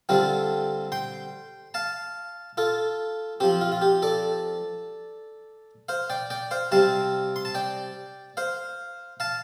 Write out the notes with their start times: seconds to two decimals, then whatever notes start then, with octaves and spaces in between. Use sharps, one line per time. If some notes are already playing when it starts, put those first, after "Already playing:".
0.09 D3 G3 C4 F4 A4
0.92 G5 C6
1.74 F5 A5
2.57 F4 A4
3.40 F3 C4 G4
3.61 F4
3.72 F4
3.82 G4
4.02 A4 D5
5.89 C5 F5
6.10 D5 G5
6.30 D5 G5
6.51 C5 F5
6.72 C3 G3 C4 F5 A5
7.36 C6
7.45 A5
7.55 D5 G5
8.37 C5 F5
9.20 F5 A5